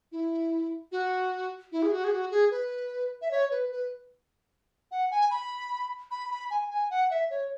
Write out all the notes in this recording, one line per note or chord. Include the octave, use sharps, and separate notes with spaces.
E4
F#4
E4
G#4
F#4
G#4
F#4
G#4
B4
E5
C#5
B4
B4
F#5
G#5
B5
B5
B5
G#5
G#5
F#5
E5
C#5